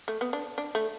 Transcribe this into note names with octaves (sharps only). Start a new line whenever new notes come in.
A3
B3
D4
D4
A3